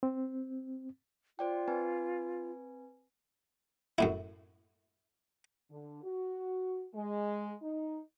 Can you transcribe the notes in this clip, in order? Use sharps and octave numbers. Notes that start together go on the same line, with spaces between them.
C4
F4 C5 D5 G5
C4 B4 G#5
F#2 A2 E4
D3
F#4
G#3
D#4